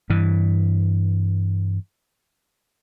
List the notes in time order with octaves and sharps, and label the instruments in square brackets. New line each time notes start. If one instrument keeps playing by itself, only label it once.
[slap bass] G2 E3